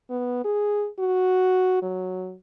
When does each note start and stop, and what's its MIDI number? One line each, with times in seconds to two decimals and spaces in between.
0.10 0.40 59
0.45 0.88 68
0.99 1.80 66
1.82 2.35 54